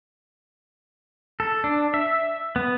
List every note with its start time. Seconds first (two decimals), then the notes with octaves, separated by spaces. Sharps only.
1.40 A4
1.64 D4
1.94 E5
2.56 B3